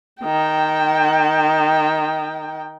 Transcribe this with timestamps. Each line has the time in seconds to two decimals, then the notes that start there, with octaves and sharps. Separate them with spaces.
0.23 D#3 G5